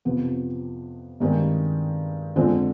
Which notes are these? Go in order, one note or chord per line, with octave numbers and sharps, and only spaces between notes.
F2 C3 F3 B3
G2 D#3 G#3 C4
F2 D3 G#3 C4